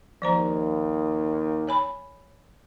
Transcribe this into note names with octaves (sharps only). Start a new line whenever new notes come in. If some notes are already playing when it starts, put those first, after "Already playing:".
D#2 F3 C5 A#5
C#5 G#5 B5